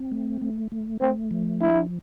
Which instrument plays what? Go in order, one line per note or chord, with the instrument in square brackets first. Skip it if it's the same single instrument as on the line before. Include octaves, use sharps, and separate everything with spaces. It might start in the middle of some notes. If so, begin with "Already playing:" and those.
Already playing: [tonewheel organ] C4
A3
A3
A3
[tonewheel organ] A3 [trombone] C4
[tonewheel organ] F3
[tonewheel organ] D4 [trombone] E4